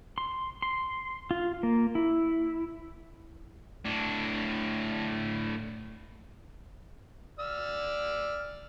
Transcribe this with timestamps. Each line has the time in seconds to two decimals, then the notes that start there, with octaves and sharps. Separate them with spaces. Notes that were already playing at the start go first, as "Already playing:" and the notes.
0.18 C6
0.62 C6
1.31 F4
1.63 A#3
1.95 E4
3.85 A2 D4
7.39 D5 E6 F6